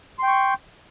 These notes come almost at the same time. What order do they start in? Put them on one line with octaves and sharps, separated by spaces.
C6 G5 C#6 G6